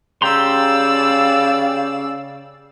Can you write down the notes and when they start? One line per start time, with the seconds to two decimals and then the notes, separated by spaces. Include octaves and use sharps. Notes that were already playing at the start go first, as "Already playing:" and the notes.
0.22 C#3 G4 D5 F5 A#5 C6 E6